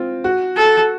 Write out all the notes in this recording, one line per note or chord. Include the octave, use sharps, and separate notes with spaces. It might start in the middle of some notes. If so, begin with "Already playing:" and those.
Already playing: C4 F4
F#4
A4